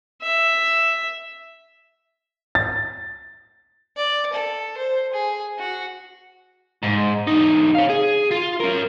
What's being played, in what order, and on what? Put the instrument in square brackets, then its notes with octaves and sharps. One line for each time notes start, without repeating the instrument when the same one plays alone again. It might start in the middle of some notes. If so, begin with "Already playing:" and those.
[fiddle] E5
[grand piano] A6
[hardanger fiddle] D5
A4
C5
G#4
F#4
[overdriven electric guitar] G#2
E2 D#4
C#5 F5
G#4
F4
C#4 A#4